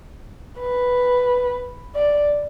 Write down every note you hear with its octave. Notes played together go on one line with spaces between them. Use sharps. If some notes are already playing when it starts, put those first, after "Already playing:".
B4
D5